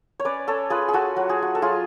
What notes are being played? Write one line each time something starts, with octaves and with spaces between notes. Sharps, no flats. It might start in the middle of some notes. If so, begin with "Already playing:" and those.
C#5
C#4 B4 D5
A4 C#5
F4 G#4 B4
G#4
F#4 A4
F#3 F#4
G#4
F#4
A4
F#3 F4 G#4